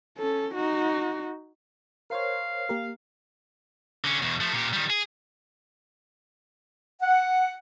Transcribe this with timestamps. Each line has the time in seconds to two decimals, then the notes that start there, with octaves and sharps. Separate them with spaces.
0.18 C#4 A4
0.55 D#4 F#4
2.10 A#4 C5 C#5 F5
2.69 A#3 G4 A#4
4.04 D3 C#4
4.22 E2 B2
4.41 F3 A3
4.53 A#2 G4
4.73 D#3 G3
4.90 G#4
7.02 F#5